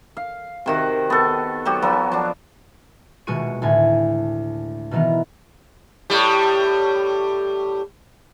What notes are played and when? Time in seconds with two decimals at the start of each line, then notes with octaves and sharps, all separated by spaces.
0.17 F5
0.66 C3 D#3 F#4
1.10 B3 A4
1.66 F#3 F#4 G4 D#5
1.82 F3 F#3 B3
2.12 F3 D4
3.27 D#1 B2 G#3 F#4 C#6 D#7
3.62 D2 A2 G#5
4.91 B2 D#3 E3 B3 A#4
6.10 A2 G3